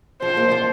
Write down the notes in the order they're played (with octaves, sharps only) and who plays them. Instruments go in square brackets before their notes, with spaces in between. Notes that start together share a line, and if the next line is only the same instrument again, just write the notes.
[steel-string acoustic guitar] F3 [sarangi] C5
[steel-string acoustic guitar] A#3
F3